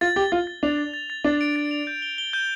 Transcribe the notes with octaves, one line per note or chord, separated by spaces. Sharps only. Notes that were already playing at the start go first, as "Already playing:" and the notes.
F4 A6
G4 G7
F4 A6
A6
D4 F7
A6
A6
A6
D4 A6
D7
A6
F7
G6
G7
G7
G6